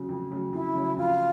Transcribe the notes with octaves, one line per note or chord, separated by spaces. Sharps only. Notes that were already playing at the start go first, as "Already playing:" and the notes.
Already playing: C#3 F#3
F2
C#3 F#3
F2 E4
C#3 F#3
F2 F4